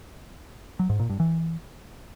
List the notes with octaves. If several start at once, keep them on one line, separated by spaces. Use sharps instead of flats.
F#3
G#2
A#2
G2
E3